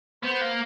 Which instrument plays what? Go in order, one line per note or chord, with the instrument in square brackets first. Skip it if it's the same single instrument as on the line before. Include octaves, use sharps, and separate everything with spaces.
[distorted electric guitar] B3 [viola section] C5
[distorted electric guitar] A#3